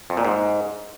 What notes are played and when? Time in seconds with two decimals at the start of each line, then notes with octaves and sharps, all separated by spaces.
0.10 F2
0.17 A#2
0.25 G#2